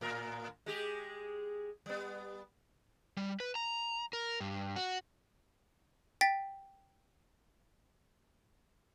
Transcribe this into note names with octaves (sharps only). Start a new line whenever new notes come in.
A2 A#4
G#3 G4 G#4
G3 B3
G3
B4
A#5
A#4
G2
F#4
G5 A6 B6